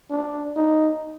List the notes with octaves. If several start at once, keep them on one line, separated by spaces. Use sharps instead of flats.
D4
D#4